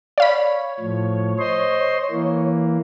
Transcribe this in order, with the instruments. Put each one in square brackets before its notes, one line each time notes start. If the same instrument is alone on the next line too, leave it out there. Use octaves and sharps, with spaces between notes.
[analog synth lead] C#5 [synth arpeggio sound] D5 F5 B5
[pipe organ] A2 F3
C5 D#5 C6
E3 A#3